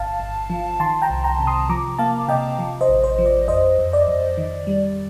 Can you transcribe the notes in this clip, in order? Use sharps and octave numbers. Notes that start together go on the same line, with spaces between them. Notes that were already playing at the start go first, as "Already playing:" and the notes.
Already playing: G1 F5 A5
G1
F3
D#3 A5 C6
G5 A#5
C2
G5 A#5
C3
C6 D#6
F3 A#5 D6
A#3 F5 A5
C3 D#5 G5
F3
C5 D#5
A1
C5
F3
D5
F2 C5 D#5
F2
D5
F2
D#3
G3